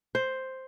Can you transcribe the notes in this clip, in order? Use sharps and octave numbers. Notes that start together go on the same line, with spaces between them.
C5